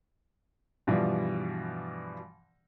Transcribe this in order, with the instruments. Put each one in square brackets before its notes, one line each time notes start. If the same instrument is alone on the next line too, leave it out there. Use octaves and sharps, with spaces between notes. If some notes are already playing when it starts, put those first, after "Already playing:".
[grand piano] G2 B2 E3 F3 G3